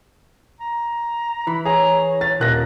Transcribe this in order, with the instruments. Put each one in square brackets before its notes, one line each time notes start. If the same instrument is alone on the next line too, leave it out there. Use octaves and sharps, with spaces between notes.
[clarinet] A#5
[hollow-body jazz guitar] E3 [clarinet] B5
[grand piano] G#4 [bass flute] C#5 [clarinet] A#5
[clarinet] B4 [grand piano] A6
[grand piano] D#1 F#6 A#6 [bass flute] A#4 [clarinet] D#5